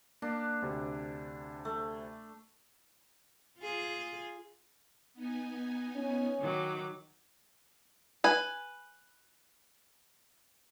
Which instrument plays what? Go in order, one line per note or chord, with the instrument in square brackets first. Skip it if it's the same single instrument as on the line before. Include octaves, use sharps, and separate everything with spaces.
[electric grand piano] A#3 [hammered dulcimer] D4
[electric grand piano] D2 C3
[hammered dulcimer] A3
[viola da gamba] F4 G#4
[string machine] B3 D#4 G#5
[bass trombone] C#4
[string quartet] D#3 F#3 D6
[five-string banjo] B4 G#5